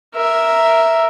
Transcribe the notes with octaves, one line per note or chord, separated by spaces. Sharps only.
A#4 E5